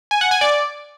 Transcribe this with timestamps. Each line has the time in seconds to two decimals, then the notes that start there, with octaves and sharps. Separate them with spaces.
0.11 G#5
0.21 F#5
0.31 G#5
0.41 D5